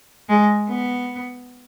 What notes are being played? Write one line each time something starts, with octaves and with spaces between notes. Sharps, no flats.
G#3
B3